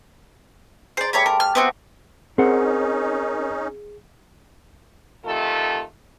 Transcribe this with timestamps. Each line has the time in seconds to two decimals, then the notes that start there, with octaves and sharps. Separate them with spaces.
0.97 G#4 C5 D5 A#5
1.13 G3 A3 G4 C#5 A#5 B5
1.26 A#4 C5 A5 B5
1.40 F6
1.55 B3 C4 F#4 C5 C#5 E5
2.38 C4 C#4 D#4 G#4 A#4 F#5
5.25 C3 D#3 A3 F4 A4